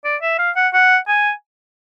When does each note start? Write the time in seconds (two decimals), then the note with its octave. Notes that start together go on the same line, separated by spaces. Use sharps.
0.04 D5
0.22 E5
0.38 F5
0.56 F#5
0.73 F#5
1.08 G#5